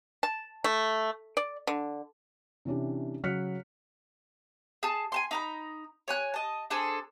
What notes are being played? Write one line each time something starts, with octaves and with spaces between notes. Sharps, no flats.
A5
A3
D5
D3
C3 E3 C#4 D4 G4
C#3 F#3 F6 F#6 B6 C#7
G#4 A5
G#5 A5 C6
D#4 A#5 B5
C#5 G#5 F#6
D#5 A5
D4 G#4 A4 C5